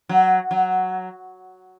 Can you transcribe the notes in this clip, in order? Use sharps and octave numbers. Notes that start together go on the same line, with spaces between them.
F#3
F#3